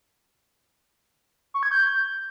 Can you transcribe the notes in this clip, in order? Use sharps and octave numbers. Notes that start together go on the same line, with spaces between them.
C#6
G#6
G6